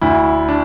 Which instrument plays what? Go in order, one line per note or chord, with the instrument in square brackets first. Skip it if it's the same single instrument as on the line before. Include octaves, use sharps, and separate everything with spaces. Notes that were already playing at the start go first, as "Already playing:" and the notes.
[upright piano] D2 [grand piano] E4
[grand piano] D4